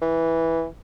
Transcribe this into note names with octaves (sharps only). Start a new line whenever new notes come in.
E3